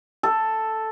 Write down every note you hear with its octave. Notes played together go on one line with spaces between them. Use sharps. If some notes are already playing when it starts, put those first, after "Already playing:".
A4